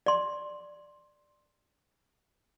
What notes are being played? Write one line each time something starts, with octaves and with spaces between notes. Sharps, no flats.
D5 C6